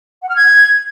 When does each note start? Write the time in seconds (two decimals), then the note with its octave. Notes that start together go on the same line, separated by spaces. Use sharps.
0.22 F#5
0.29 F6
0.36 G#6